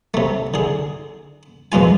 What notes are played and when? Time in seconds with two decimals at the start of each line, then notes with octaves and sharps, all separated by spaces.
0.14 C3 A3
0.54 D3 G#4
1.72 F2 B2 G#3 F4 G#5